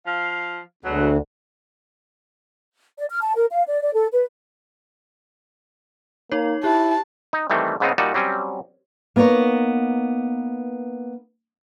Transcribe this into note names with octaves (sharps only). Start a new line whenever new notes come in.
F3 F5
D2 B2 F#3 G#3
D5
F6
A5
A#4
F5
D5
D5
A4
B4
A#3 D#4 C#5
E4 G4 A5
D#4
D#3 E3 G3 A3 C4
G#2 C#3 B3 C4 D#4
A#2 G3 D#4 F#4 A5
F#3 G3 C4 C#4
A#3 B3 D#4 A#4 C#5